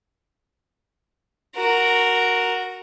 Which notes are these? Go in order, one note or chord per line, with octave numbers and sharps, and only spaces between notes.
F#4 A#4